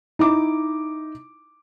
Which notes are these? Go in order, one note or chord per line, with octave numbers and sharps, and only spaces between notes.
D#4 E4 D6